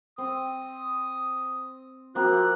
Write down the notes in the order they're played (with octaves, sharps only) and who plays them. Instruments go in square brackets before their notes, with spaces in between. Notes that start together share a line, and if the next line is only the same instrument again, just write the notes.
[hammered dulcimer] C4 [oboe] D#6
[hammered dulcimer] F3 A#3 C4 [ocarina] F#4 [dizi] F#6